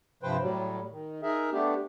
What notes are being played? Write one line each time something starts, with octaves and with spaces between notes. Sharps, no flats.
G2 C3 F3 B4 C5 G5
A2 F#3 G3
D#3
D#4 G#4 A#4 E5
A3 B3 D4 G4